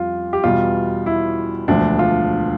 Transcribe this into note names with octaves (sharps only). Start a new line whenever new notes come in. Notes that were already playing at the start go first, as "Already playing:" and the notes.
Already playing: F2 G3 F4
G4
E2 B2 G3 F4
E4
E1 D2 D3 F3 D4
F4